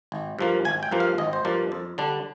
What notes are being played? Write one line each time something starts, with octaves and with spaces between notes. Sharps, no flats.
G#1
G2 F3 A#3
G#1 G#5
G5
G2 F3 A#3
F5
G#1 D#5
C5
G2 F3 A#3 D5
F2
D3 G3 D4